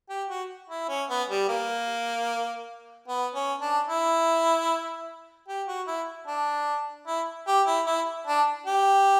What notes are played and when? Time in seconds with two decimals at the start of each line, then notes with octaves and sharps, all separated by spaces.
0.09 G4
0.29 F#4
0.70 E4
0.88 C#4
1.10 B3
1.29 G3
1.48 A#3
3.08 B3
3.35 C#4
3.61 D4
3.88 E4
5.48 G4
5.68 F#4
5.87 E4
6.27 D4
7.07 E4
7.47 G4
7.66 E4
7.86 E4
8.27 D4
8.66 G4